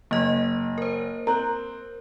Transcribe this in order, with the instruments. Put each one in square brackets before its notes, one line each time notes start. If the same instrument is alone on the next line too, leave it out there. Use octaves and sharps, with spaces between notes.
[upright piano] F#1 [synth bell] A#3 D#5
[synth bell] A#4 C5
[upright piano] C4 F#6 [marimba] A#5